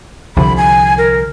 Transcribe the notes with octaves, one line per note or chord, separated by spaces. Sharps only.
C2 D3 F3 B5
G#5
A#4